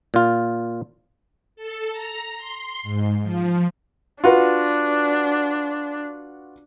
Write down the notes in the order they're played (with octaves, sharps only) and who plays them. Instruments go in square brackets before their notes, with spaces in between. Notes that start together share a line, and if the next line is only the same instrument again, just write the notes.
[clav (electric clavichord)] A#2 F4
[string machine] A4
A#5
C6
G#2
F3
[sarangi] D4 [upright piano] F4 F#4 B4